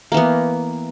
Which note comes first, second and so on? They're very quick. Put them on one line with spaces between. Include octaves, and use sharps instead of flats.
A#3 E3 B3